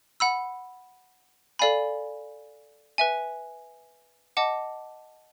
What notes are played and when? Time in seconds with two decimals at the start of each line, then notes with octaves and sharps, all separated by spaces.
0.20 F#5 B5 E6
1.59 A4 D5 F5 G#5 B5
2.98 B4 E5 G#5
4.37 D#5 F#5 A5 D6